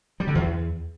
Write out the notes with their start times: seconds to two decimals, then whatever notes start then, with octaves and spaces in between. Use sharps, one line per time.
0.20 G3
0.28 D3
0.35 E2